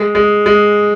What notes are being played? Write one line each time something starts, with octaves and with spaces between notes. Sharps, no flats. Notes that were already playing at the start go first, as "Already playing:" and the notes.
Already playing: G#3
G#3
G#3